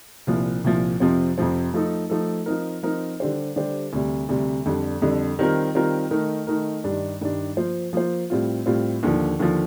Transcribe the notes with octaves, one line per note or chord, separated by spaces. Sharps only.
C2 A#2 F3
C2 A#2 F3
F2 C3 F3 C4
F2 C3 F3 C4
F3 A3 D#4 A4
F3 A3 D#4 A4
F3 C4 D#4 A#4
F3 C4 D#4 A#4
D3 G3 D4 G4 C5
D3 G3 D4 G4 C5
D2 C3 G3
D2 C3 G3
F2 D3 G3
F2 D3 G3
D#3 G3 C4 F4 A#4
D#3 G3 C4 F4 A#4
D#3 A3 D#4 A#4
D#3 A3 D#4 A#4
G2 D#3 G3 D4
G2 D#3 G3 D4
F3 A#3 F4 C5
F3 A#3 F4 C5
A2 G3 C4 F4
A2 G3 C4 F4
D#2 D3 F3
D#2 D3 F3